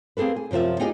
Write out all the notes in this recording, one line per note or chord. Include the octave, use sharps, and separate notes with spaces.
A#3 C4 G#4 A4 B4
G#4
F#2 C3 F3 F4 E5
D#4 F4 G4 G#4 D5 D#5